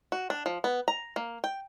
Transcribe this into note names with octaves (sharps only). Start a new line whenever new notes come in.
F#4
D4
F3
B3
A#5
A#3
G5